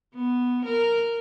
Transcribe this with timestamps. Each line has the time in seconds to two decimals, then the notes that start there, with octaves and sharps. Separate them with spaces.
0.15 B3
0.66 A#4